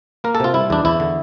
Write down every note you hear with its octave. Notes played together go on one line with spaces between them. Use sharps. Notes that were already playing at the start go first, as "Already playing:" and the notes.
A#3 A#4
A4
C3 F4
G3 E4
E2 D4
E2 E4
D3